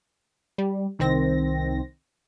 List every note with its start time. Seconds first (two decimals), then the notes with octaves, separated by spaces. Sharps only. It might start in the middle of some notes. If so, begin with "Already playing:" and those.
0.58 G3
0.99 C2 D#3 C4 A#6